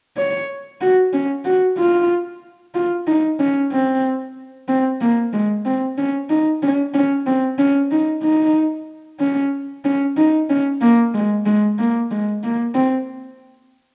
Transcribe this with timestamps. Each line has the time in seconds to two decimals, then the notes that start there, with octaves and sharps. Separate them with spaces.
0.17 C#5
0.80 F#4
1.13 C#4
1.45 F#4
1.78 F4
2.75 F4
3.07 D#4
3.39 C#4
3.72 C4
4.68 C4
5.01 A#3
5.33 G#3
5.65 C4
5.98 C#4
6.30 D#4
6.62 C#4
6.94 C#4
7.26 C4
7.58 C#4
7.91 D#4
8.23 D#4
9.20 C#4
9.85 C#4
10.16 D#4
10.49 C#4
10.81 A#3
11.14 G#3
11.46 G#3
11.79 A#3
12.11 G#3
12.43 A#3
12.74 C4